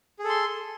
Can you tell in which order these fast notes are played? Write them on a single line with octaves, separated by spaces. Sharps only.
G#4 A4 C6